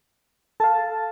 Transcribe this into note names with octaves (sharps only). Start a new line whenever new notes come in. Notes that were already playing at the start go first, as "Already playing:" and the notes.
A4 F5 A5